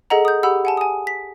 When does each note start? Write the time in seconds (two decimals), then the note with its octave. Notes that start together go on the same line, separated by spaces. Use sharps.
0.10 G#4 A4 D#5 F#5 A#5
0.25 D#6 G6
0.43 G4 F#5 B5 E6
0.65 F#5 G#5 A5
0.77 G#5 D#6
1.07 B6